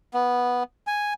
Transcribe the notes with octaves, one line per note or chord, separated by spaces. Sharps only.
B3
G#5